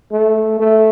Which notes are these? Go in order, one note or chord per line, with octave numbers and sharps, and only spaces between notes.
A3
A3